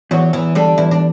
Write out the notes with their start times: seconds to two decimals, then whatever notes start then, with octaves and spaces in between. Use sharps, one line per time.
0.11 E2 F#3 F#4
0.33 E2 E3 E4
0.55 D3 G3 D4
0.78 E2 E4
0.91 D4